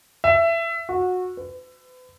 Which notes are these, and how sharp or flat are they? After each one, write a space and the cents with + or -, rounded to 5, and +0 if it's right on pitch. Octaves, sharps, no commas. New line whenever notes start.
E5 +20
F#4 -20
B4 +40